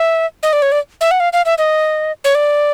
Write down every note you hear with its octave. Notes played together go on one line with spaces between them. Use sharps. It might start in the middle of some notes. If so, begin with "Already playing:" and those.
Already playing: E5
D#5
D5
C#5
D5
E5
F#5
F5
F5
E5
D#5
C#5
D5